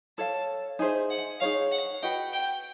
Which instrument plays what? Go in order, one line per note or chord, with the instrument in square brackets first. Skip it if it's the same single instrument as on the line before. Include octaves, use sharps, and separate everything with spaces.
[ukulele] A4 C#5 F5 [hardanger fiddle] A5
[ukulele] D#4 G#4 C5 E5 [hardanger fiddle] G#5
[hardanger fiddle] F#5
[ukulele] D#4 G#4 C#5 [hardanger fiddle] F5
[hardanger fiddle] F#5
[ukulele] F#4 B4 D#5 F#5 [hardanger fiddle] G5
[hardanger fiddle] G5